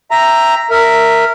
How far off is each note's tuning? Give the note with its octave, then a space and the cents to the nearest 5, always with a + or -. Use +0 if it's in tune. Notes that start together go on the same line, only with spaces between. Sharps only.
E5 +10 G5 +0 A#5 +0
A#4 -10 E5 +0